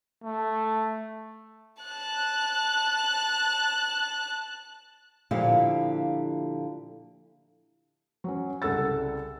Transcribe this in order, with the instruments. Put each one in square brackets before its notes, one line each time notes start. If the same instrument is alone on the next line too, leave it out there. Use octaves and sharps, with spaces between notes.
[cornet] A3
[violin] A5 F#6
[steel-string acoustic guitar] A#2 D3 F3 E4 G4 F5
[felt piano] F#3 C#4
C2 C#3 A4 F#5 E6 A6